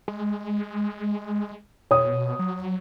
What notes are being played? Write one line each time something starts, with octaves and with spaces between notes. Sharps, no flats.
G#3
B2 C#5 D#6
F#3